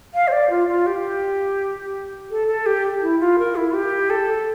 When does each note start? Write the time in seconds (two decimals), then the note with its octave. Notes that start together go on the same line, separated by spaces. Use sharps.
0.14 F5
0.28 C5
0.32 D5
0.50 F4
0.68 F4
0.86 G4
2.31 A4
2.47 A4
2.66 G4
3.02 E4
3.20 F4
3.38 A#4
3.56 E4
3.75 G4
4.10 A4